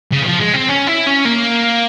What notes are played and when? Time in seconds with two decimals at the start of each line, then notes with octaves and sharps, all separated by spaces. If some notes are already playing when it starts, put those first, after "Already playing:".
0.13 C#3
0.22 E3
0.26 F3
0.40 G#3
0.54 C4
0.69 C#4
0.87 E4
1.07 C#4
1.25 A#3